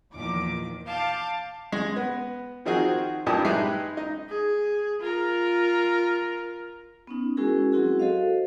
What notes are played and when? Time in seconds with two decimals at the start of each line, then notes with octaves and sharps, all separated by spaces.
0.15 E2 A#2 D#3 F3 D6
0.87 F5 A5 D6 G6
1.72 G#3
1.96 B3
2.65 D#3 F3 C4 D#4 F#4 G#4
3.26 G2 A#2 D#4 G4 A5 D#6
3.45 G#3 D#4 E4 G4 B4
3.97 D#4
4.29 G#4
5.01 F4 A#4
7.07 B3 C#4 D#4
7.37 G#3 C#4 E4 F#4 G#4 A#4
7.72 F#3 C4 E4 F#4 G#4
7.99 F#4 A4 C5 D#5 F5